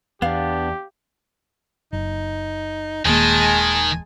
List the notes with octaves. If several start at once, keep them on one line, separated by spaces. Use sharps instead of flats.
E2 B3 D4 G4 F5
F#1 D#4
D#1 D#3 G#3 A#3 G#5 A5